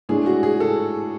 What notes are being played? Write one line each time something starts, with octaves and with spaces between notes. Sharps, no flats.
A2 G#3 D4 G#4
F#4
G#4
A4